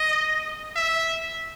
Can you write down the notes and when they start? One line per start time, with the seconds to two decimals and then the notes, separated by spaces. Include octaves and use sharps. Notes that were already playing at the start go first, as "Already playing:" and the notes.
Already playing: D#5
0.76 E5